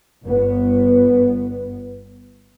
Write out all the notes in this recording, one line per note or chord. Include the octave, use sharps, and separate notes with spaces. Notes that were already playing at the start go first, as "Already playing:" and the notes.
G1 B3